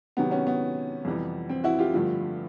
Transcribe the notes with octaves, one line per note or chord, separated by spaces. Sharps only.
C3 D#3 F#3 B3
B3 C#4
B3
F2 C3 E3 G3
C4
E4 F#4
F4 G4
G2 D3 F3 A3